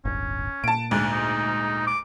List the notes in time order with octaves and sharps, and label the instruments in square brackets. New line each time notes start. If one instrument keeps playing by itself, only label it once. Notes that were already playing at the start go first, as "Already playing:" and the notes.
[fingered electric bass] D1 G1 [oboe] C#4
[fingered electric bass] A#2 [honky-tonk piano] A5 D7
[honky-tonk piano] D2 G#2 [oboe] D4
[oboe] D#4
D6